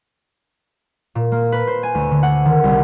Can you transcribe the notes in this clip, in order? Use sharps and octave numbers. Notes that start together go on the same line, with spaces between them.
A#2
A#3
B4
C5
G#5
D2
D3
F#5
D#3
C2